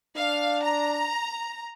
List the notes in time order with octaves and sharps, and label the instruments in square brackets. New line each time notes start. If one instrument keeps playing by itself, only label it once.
[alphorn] D4 [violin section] F5
[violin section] A#5